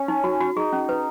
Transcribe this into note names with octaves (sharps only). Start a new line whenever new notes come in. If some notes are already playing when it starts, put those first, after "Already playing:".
Already playing: C#4
D#4
F#4
F#4
D#4 G#4
C#4
B4